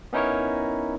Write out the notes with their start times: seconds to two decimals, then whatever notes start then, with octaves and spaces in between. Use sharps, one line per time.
0.13 B3 C#4 D#4 E4 A#4 C#5